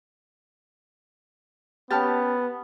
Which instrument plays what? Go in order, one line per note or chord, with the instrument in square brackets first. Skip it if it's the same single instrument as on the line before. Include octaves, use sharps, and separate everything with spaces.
[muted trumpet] B3 [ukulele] C#4 G4 [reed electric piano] A5 F6 A6